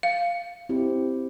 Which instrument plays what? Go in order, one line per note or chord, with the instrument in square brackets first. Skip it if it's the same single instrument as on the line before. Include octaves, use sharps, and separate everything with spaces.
[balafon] F5
[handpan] C4 E4 G4